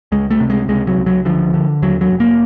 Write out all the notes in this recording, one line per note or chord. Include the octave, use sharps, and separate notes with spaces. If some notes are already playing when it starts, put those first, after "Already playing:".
C#2 G#3
A3
C3
G#3
C#2 G#3
F#3
C#2
F#3
D3 F3
D3
D#2 F#3
F#3
F1
A#3